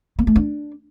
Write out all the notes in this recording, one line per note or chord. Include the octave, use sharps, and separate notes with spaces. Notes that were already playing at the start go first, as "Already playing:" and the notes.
A#3
A3
D4